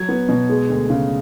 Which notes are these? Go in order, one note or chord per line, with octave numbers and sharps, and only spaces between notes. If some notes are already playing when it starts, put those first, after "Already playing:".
Already playing: F#3 G#6
B3
B2
G#3
D2
C#3